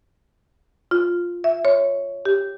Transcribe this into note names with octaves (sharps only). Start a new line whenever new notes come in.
F4
E5
C#5
G4